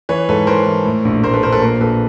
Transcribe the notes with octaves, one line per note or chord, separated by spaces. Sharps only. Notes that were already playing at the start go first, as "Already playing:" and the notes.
E3 B4 C#5
G#2 A4 B4
E3 A#4 C5
E3
A2
A#1
A2 A#4 C5
A4 B4
A#1 A#4 C5
A4 B4
A#2 A#4 C5
A#1 A4 B4